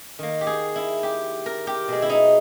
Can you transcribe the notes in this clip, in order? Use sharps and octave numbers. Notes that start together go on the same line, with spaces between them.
D#3 A#3
G4
G#4
E4
G4
A#4
G4
B2 G#3
E4
D#4